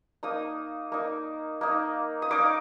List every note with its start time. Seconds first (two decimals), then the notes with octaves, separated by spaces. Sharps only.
0.23 A#3 D#4 D#6
0.92 A#3 D#4
1.61 A#3 D#4
2.22 D#6
2.31 A#3 D#4 D6